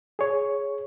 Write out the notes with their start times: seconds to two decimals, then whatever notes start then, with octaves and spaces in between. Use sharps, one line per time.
0.19 G#4 C#5